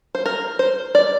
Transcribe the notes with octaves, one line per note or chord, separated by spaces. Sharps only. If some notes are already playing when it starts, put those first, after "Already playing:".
C5
A#4
C5
D5